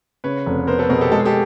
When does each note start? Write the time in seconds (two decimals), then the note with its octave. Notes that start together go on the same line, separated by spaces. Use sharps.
0.24 C#3 B4 C#5
0.46 F1
0.67 B3 A#4 C5
0.79 A4 B4
0.89 B2 G#4 A#4
1.01 G4 A4
1.12 G#3 A4
1.19 G#4
1.25 G4 A4